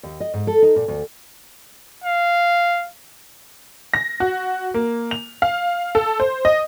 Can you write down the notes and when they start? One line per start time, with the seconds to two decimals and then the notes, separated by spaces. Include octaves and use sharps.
0.03 D#2
0.20 D#5
0.34 G#2
0.47 A4
0.62 D#4
0.76 A#2
0.88 D2
2.04 F5
3.94 A#6
4.20 F#4
4.74 A#3
5.11 F7
5.42 F5
5.95 A4
6.20 C5
6.45 D#5